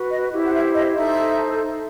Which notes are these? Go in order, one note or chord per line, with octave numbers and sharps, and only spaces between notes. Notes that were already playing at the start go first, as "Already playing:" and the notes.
Already playing: F#4 B4
D#5
E4 G4 C5
F#5
E5
D#5
D#4 A4 C5 E5